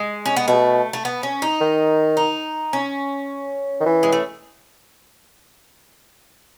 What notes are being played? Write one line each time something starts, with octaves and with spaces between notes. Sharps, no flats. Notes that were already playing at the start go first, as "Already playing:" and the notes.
Already playing: G#3
C#4
B3
B2 A3
A3
B3
C#4
D#4
D#3
D#4
C#4
D#3
E3
G#3
A3